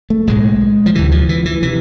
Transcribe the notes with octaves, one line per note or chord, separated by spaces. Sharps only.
A3
B1 A2 G#3
F3
D2 C3 E3
F3
E3
E3
C3 E3